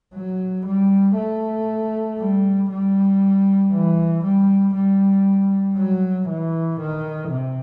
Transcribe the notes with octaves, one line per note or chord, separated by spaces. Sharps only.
F#3
G3
A3
G3
G3
E3
G3
G3
F#3
E3
D#3
C3